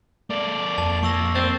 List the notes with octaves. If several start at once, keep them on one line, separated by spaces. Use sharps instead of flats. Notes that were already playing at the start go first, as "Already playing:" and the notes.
A#3 A4 D5
F2 A5
F3 A#3 C#6 E6 A#6
C4 A6